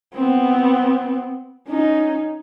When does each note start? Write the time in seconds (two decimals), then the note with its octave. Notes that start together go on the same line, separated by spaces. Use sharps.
0.14 B3 C4
1.68 C#4 D#4